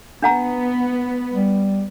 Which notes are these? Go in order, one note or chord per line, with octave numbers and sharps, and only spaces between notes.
B3 D4 F#5 A#5
G3